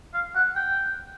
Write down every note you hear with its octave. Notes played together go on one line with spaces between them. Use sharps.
F5
F#5
G5